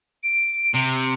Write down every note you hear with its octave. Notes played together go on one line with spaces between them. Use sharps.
D7
C3